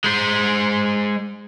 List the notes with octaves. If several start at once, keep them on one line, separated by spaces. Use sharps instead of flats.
G#3 C5